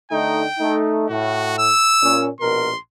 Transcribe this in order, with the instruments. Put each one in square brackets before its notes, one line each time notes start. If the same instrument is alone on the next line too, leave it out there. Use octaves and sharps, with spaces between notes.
[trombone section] D3 A3 D#4 [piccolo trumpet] G5
[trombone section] A3 D#4
[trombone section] A2 [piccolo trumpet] F#4
[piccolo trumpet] E6
[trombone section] A#2 C#4
[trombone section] A#1 B2 A#4 [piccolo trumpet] C6